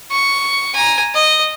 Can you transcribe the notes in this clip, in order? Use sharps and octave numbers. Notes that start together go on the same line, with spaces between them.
C#6
G#5 A#5
D#5